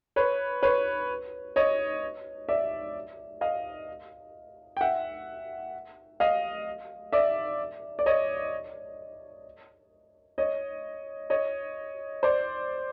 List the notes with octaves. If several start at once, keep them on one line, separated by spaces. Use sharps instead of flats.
B4 C#5
B4 C#5
C#5 D#5
D5 E5
D#5 F5
G5
E5 F#5
D#5 F5
D5 E5
D5
C#5 D#5
C#5 D#5
C#5 D#5
C5 D5